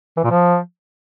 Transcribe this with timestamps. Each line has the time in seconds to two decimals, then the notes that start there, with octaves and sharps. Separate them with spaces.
0.17 E3
0.24 A#2
0.31 F3